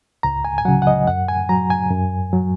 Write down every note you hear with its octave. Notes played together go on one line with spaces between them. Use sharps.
C#2 A#5
G#5
G#5
C#3 F#3 F#5
F#5
D#5
F#2 F#5
G#5
F#3 A#5
G#5
F#2
F#3